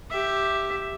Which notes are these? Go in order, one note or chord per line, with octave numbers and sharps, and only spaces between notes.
G4 E5